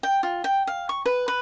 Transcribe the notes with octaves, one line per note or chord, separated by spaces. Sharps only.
G5
F4
G5
F5
C#6
B4
B4